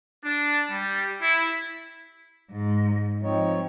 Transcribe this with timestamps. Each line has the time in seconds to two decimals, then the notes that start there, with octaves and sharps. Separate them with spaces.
0.24 D4
0.71 G3
1.22 E4
2.51 G#2
3.23 F3 C4 D#4 C#5